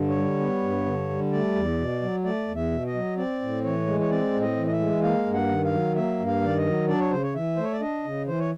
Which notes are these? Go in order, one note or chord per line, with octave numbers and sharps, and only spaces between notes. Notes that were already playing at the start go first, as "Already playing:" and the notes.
Already playing: G2 D3
C#5
G3
B3
G2
D3
G3
A3 D5
E2
B2
F#3
A3 D5
E2
E5
B2
D#5
F#3
C4 D5
A2
E3 C#5
G#3
C#5
C4 D5
A2
D#5
E3
D#5
E5
G#3
A#3 F5
G2
F#5
D#3
F5
F#3
A#3 E5
G2
F5
D#3 D5
D#5
F#3
D4 D5
C#5
C#3 C5
C#5
E3 E5
A3 C5
C#5
D5
D4 D#5
C#3
E3 C5
C#5